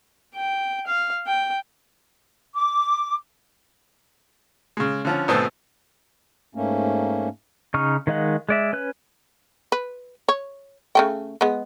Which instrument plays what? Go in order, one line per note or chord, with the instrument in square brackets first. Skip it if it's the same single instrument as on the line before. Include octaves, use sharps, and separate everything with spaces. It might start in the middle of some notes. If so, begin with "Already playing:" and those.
[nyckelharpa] G5
F5
G5
[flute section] D6
[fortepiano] C#3 G#3
D3 F3 C#4
G#1 B2 A3 C4 B4 C5
[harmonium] G#2 A3 A#3 C#4
[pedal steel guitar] C#3 D#4 C#6 F6
D#3 G#3 D#5 F5 F#5
G#3 D5 E5
C#4 B4 F#6
[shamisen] B4
C#5
C#3 A3 G5
G#3 B3